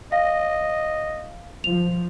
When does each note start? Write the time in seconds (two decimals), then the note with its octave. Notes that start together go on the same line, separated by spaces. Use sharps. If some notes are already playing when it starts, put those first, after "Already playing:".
0.12 D#5 F5 A#6
1.64 F3 F7